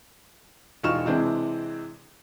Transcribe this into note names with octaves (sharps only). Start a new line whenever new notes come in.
E1 D#4 F4 C#6 F6 E7
C3 E3 G#3 C4 D4